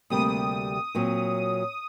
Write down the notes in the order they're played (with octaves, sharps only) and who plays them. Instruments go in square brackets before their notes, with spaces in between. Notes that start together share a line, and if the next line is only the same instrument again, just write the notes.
[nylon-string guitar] D2 C3 G3 A#3 [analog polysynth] D#6
[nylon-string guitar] A#2 F#3 C4